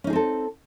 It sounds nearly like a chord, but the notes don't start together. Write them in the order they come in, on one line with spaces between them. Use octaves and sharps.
C#4 D#4 G#4 C4 A4